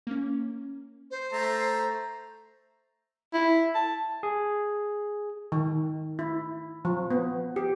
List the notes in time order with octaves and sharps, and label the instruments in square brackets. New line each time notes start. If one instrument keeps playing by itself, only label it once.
[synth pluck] A#3 C#4
[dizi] C5
[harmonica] A3 A#5
[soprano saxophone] E4
A5
[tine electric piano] G#4
[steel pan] D#3
E4
F3
B3
G4